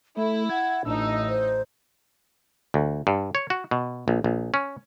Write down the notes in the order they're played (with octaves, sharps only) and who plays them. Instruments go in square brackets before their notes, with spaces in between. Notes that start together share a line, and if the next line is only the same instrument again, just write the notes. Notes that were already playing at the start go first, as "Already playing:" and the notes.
[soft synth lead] A3 [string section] E4 [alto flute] A4
[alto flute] F#5 [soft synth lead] G#6
[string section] A1 D#4 [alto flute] D4 [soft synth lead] E6
[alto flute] C5
[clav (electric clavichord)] D2
G2
C#5
F#4
B2
A#1
A#1
C#4